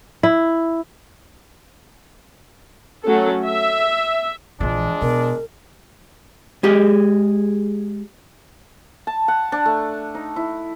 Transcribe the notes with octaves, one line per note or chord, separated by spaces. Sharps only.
E4
F#3 A3 C#4 A4
E5
A#1 E3 F3 G#3 D4
B2 A#4
G#3 G4 G#4 D#5
A5
F#5
D4
A3
D#4
E4